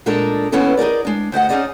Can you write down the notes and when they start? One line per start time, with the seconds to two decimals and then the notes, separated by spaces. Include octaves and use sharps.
0.06 A#2 G#3 D4 D#4 A4 A#4
0.52 E3 A#3 B3 C#4 E4 A4
0.77 D#4 G#4 A#4 D5
1.05 G#3 D4
1.32 D2 C5 D#5 F#5
1.49 C#4 D#4 G#4 C5 D5 D#5